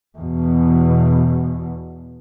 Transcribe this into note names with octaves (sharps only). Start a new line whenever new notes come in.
E2 B2